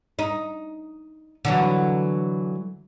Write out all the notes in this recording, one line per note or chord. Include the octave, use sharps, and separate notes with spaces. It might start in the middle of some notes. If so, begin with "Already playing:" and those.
D#4
D3 E3 F#3